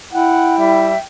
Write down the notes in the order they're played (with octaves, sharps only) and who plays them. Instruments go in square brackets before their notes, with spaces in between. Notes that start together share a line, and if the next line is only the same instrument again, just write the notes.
[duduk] E4 [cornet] F#5 [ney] G5
[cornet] G3 [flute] E5